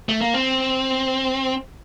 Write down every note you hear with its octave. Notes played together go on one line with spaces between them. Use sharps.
A3
A#3
C4